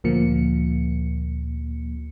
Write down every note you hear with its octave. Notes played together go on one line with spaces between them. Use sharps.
D2 A#2 F3 A#3 C#7